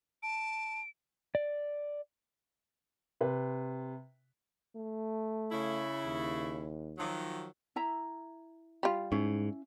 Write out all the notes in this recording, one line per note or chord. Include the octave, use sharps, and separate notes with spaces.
A5 D7
D5
C3 B4
A3
C#3 E4
D#2
D#3 F3 F#3
E4 E5 A#5
G3 F4
G#2 C#4 E4 F5